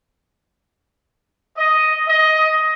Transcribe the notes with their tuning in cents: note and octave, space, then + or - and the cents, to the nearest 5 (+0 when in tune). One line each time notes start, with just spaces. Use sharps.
D#5 +5
D#5 +15